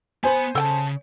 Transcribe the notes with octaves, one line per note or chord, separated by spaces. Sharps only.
B3 C5 G#5 B5
C#3 A4 G5 A5